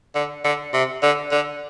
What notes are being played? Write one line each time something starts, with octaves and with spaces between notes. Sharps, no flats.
D3
D3
C3
D3
D3